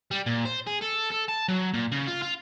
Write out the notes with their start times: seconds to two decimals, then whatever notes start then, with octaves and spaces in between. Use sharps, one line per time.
0.11 G3
0.26 A#2
0.45 C5
0.67 G#4
0.82 A4
1.12 A4
1.29 A5
1.48 F#3
1.74 A#2
1.92 C#3
2.08 F4
2.22 F4